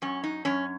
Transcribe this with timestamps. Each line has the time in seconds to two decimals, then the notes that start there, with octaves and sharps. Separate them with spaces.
0.02 F#2 C#4
0.24 D#4
0.45 F#2 C#4